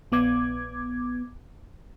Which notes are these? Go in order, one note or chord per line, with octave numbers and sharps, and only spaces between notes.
A#1 B3 D6 G#6